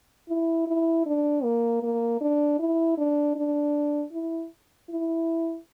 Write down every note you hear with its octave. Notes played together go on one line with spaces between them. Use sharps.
E4
E4
D4
A#3
A#3
D4
E4
D4
D4
E4
E4